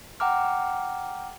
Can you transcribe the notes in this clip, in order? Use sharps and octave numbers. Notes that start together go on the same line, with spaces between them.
F#5 G5 A#5 D6 F6